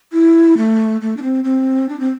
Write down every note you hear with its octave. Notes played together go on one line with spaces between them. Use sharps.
E4
A3
A3
D4
C4
C4
D4
C4